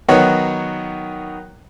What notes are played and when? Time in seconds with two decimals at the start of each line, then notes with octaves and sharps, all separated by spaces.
0.08 D#3 F#3 B3 D#4 F#4 C#5